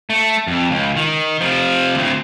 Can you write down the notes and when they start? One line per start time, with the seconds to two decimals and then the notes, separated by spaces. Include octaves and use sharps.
0.10 A3
0.47 F2
0.71 C#2
0.97 D#3
1.41 C3 F3
1.95 D2 C4